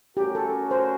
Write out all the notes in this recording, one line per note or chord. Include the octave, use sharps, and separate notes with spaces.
A3 C#4 F#4 G4 A#4
A4
C5